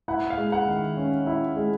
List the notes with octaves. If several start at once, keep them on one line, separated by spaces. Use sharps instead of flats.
E4 F#5
F5
G#3
F#5
D#3
C#4
E4
G#3